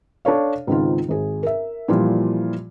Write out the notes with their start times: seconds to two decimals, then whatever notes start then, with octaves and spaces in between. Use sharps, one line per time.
0.25 D4 A4 C#5 F5
0.67 C#2 G#2 D#3 C4 F4
1.08 G#1 G#4
1.43 A#4 E5
1.88 A#2 E3 F3 G3 F4